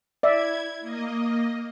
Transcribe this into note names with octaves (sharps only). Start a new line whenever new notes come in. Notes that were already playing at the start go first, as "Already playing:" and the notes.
E4 D5 E5 G#6
A#3 D#5